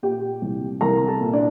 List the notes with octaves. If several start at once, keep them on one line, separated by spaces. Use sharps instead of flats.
A#2 G4 G5
C2
C2 A#4 A#5
A4 A5
A#2
D4 D5